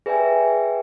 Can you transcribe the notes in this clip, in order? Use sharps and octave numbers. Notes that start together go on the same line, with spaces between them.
G#4 B4 D5 E5 G5 G#5